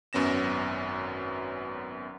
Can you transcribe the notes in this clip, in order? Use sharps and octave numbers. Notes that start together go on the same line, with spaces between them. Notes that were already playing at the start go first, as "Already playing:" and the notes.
G#1 F#2 B3 C#4 A#6 E7